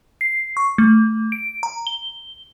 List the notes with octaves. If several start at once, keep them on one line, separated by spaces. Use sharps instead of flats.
C7
C#6
A3
D7
A#5
G7